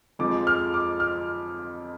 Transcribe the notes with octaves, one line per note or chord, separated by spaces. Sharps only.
F2 F3 G#3 D6
F6
D6
F6